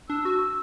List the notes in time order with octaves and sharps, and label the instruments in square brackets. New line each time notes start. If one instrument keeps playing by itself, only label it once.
[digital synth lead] D4 [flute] E6
[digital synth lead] F#4